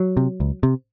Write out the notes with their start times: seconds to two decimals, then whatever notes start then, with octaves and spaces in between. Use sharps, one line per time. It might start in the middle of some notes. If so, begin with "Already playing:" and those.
Already playing: F#3
0.17 C3
0.40 C#2
0.63 C3